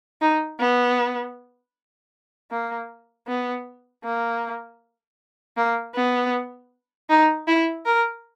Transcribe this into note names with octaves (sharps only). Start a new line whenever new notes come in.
D#4
B3
A#3
B3
A#3
A#3
B3
D#4
E4
A#4